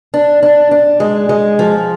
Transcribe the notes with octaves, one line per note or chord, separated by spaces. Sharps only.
D4
D4
D4
G#3
G#3
F3